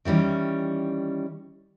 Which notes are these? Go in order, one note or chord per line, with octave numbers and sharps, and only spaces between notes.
D#3 E3 G3 C#4